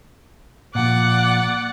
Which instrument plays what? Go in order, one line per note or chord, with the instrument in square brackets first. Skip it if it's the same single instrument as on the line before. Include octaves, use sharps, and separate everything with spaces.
[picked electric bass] A#2 F3 [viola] D5 F#5